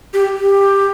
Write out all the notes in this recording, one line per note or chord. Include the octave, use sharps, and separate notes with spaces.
G4
G4